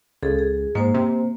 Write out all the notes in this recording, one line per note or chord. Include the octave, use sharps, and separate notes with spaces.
C#2 G#4 A4
G#4
G#2 A#3 C5
C3